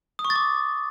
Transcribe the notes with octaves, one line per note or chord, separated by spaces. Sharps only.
D#6
C#6
A6
D6